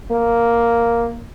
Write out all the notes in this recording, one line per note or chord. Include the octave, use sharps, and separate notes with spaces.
A#3